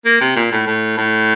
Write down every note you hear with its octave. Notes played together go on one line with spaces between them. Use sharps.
A#3
C3
A#2
A2
A2
A2